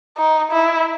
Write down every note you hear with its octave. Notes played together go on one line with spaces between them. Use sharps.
D#4
E4